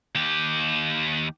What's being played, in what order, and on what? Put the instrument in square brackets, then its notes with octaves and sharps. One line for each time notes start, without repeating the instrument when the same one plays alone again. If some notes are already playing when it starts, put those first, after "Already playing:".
[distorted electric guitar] D#2 G4